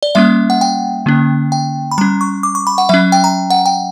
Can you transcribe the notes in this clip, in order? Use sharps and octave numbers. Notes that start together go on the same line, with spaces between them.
D5
G3 A#3 C#4 E5
F#5
G5
D3 A#3 C#4
G5
B5
G3 C#4 A#5
C#6
D6
C#6
B5
F#5
F#3 C#4 E5
G5
A#5
F#5
G5